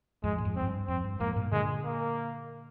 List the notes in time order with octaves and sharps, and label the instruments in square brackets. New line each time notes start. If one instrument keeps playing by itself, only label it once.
[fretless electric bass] F2 G#2 [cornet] G#3
[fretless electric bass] A#2
F2 G#2
[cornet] C4
[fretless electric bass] F2
G2
[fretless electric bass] F2 [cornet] C4
[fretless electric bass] G2
[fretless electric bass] F2 G#2 [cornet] A#3
[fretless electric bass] G2 A#2
[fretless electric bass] A#2 D3 [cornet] G#3
[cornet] A#3